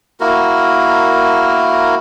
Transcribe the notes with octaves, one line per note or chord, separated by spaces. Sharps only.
A#3 E4 F#4 A#4